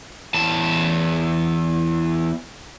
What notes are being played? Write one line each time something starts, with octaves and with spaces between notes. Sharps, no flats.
E2 A5